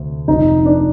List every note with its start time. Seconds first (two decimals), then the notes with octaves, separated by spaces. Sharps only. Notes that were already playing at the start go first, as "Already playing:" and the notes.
Already playing: D2 C3
0.28 F1 F2 C3 D#4
0.65 D4